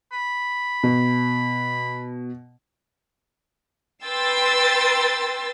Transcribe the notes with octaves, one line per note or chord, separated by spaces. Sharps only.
B5
B2
B4 G5 C6 E6 A6